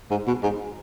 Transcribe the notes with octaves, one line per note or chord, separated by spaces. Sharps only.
G#2
B2
G#2